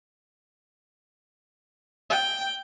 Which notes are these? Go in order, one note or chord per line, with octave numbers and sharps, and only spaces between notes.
G5